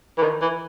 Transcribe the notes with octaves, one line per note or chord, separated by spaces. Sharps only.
E3
D#3
E3